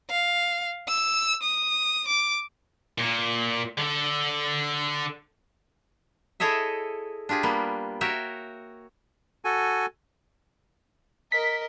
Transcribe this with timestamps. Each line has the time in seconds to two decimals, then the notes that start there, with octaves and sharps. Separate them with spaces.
0.10 F5
0.88 E6
1.43 D#6
2.08 D6
2.98 A#2
3.77 D3 A4
6.40 E4 G#4 A4 C#5 D#5 E5
7.29 D4 F4 G4 G#4
7.43 G3 A#3 B3
8.01 F#4 A#4 C#5 E5 G5
9.45 F#4 A4 G#5
11.32 A#4 D#5 B6